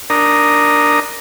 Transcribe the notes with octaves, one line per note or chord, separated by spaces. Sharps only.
D4 A#4 A#5 D#6